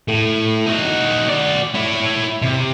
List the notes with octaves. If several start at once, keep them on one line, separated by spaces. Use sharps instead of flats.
A2
D#4 F#4
F#4 D5
E4 C#5
C3